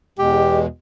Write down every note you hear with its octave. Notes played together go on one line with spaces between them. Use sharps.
E2 B2 G#3 G4